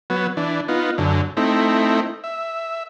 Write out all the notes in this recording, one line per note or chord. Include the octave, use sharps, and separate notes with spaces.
F#3 B3
E3 D4
B3 D#4 F4
F#2 D3
A3 C4 D#4 E4
E5